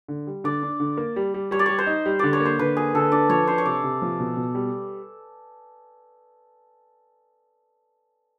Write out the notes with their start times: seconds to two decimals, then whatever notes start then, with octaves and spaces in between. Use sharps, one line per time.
0.08 D3
0.27 G3
0.44 D3 D5
0.63 D4
0.80 D3
0.97 A#3
1.16 G3
1.34 G3
1.51 G3 C#5
1.59 D5
1.66 G3 C#5
1.79 C5
1.87 D#4
2.06 G3
2.19 D3 D5
2.33 C#5
2.40 A#3
2.45 C5
2.59 D3 B4
2.77 A#3 G#4
2.94 D3 A4
3.12 D4 D5
3.30 F3 C#5
3.47 D4 C5
3.58 C#5
3.65 C3 D5
3.84 C3
4.02 F3
4.20 B2
4.37 B2
4.55 G3